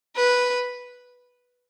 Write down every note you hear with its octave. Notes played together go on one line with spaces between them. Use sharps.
B4